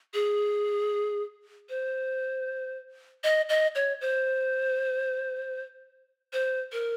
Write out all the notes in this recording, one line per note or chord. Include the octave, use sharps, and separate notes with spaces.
G#4
C5
D#5
D#5
C#5
C5
C5
A#4